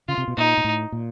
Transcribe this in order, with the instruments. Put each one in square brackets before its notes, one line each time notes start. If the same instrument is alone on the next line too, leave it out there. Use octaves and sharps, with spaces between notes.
[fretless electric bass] C#3 [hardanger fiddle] F4
[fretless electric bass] C3
B2
[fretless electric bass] A#2 [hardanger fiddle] D#4
[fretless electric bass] A#2
A2
A#2